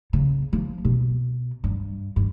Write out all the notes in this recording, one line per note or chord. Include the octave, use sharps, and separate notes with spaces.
C#3
F3
B2
G2
G2